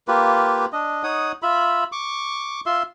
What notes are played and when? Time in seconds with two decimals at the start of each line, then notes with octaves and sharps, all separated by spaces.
0.08 A#3 F4 G4 B4
0.73 D4 D#5
1.03 D#4 C#5 F#5 D#6
1.43 F4 E5 B5
1.92 C#6 D6
2.66 F4 E5 C6